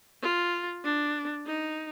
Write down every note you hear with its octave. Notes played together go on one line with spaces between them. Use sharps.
F4
D4
D#4